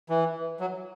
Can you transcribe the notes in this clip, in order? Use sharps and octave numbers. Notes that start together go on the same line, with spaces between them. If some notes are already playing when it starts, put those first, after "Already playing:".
E3
F#3